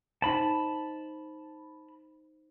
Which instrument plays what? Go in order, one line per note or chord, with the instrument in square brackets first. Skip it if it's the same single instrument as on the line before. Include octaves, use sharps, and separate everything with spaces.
[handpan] D#4 C5 [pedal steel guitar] A5 B5